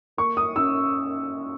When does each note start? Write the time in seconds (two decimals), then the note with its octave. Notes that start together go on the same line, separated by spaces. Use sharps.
0.17 A#3 C#6
0.37 D#6
0.56 C#4 E6